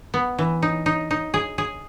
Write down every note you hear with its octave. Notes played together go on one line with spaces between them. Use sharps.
B3
E3
D#4
D#4
D#4
G#4
G#4